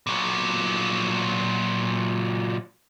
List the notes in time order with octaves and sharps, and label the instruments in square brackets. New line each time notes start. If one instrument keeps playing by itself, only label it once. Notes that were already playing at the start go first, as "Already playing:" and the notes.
[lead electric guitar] A#2 F#3